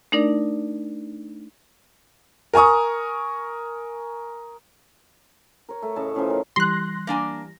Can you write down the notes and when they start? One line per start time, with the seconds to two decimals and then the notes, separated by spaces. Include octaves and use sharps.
0.12 A3 D4 D#4 A#4 D5
2.53 A#4 G#5 A#5 C#6 D#6
5.69 A#4 C#5
5.82 A3
5.96 A2 C#3 D#5 A5
6.15 A2 C#3 E3 F3
6.28 D#3 A#4
6.56 E3 G3 C6 F#6 A#6
7.07 A#3 D4 G#5